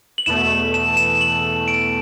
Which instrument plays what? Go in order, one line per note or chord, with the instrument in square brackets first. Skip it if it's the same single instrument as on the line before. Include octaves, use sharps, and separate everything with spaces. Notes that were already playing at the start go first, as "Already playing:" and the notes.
[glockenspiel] F#7
[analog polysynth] E2 B2 A3 [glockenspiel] E7
[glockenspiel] E7
E7
F#7
D7